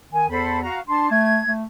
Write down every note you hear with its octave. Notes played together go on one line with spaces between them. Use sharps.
D#3 G#5
E2 A4 C5 B5
F#4 F5 A#5
D4 A5 C6
A3 G#6
A3